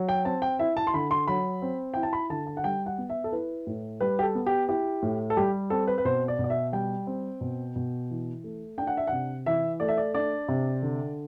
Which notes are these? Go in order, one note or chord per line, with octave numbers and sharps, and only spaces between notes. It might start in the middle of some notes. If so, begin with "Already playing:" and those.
Already playing: F#3
G5
C4 A5
G5
E4 E5
A5
C6
D3 B5
C6
F#3 B5
C4
E4 G5
A5
B5
D3 A5
A5
F#5
G3 G5
F#5
B3
E5
A4
E4 B4
A2
G3 B4
G4
A4
B3
G4
E4 G4
A2
A4
G3 G4
C4 A4
B4
B4
B2 C5
D5
B2
D5
E5
G3 G5
C4
B2
B2
E3
A3
D4 G5
F#5
E5
C3 F#5
E3 E5
A3 D5
E5
D5
D4 D5
C3
D3